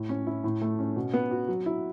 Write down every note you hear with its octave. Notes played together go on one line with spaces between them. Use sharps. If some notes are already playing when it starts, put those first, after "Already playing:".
Already playing: A2
C#4
E4
A2
A3
C#4
B2
B3
F#4
F#3
E4